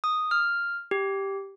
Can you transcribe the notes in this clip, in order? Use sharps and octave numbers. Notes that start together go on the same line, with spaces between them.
D#6
F6
G4